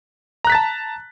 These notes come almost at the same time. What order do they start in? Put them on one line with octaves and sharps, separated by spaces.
A#5 F#6 B6 A6 A5